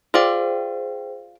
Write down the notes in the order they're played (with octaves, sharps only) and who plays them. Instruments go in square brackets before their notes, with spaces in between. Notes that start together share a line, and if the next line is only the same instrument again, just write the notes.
[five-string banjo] F4 D5 [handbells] G#4 C5 G5